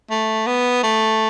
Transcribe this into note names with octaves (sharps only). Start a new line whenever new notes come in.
A3
B3
A3